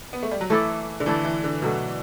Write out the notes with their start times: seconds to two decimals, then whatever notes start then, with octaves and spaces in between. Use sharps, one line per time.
0.13 B3
0.23 A3
0.31 G3
0.41 F#3
0.50 E3 A3 E4 A4 D5
1.00 D3
1.06 E3 A3 E4 A4 D5
1.24 E3
1.44 D3
1.62 B2 F#3 A3 D4